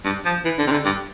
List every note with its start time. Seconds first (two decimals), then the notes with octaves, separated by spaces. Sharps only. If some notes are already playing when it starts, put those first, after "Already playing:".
0.05 G2
0.25 F3
0.45 E3
0.58 D3
0.67 C3
0.71 D3
0.85 G2